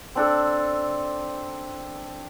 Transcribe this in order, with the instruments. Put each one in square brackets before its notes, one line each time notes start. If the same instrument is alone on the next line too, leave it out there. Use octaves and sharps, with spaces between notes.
[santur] C4 D4 A4